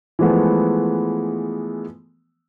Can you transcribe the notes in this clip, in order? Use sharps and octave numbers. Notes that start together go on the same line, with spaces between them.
E3 F3 G#3 A3 B3